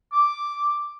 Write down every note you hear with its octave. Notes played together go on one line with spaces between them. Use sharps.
D6